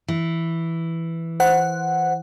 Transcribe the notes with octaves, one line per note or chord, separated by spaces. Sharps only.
E3
C5 F#5